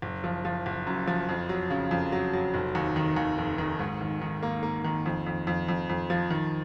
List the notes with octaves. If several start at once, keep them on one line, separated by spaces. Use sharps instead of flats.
F#1
F3
F3
F#1
F#2
F3
F2
F#3
C#3
F2
F#3
F#3
F1
D#2
D#3
D#2
F1
D#3
G#2
D#3
D#3
A#3
A#3
D#3
F2
F2
F2
F2
F2
F3
D#3